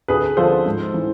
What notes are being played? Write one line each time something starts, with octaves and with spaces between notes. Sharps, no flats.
D2 G#4 B4
D3 F3 A4 C5
G#2
E3